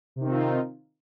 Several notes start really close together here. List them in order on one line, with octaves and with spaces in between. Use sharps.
C3 D#3 C4 F4 D#4